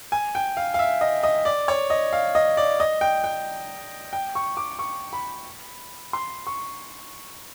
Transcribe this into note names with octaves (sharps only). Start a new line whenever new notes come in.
G#5
G5
F5
F5
E5
D#5
D#5
D5
C#5
D#5
F5
D#5
D5
D#5
G5
G5
G5
C#6
D6
C#6
B5
C6
C#6